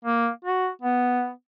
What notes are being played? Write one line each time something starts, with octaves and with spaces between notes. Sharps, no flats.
A#3
F#4
B3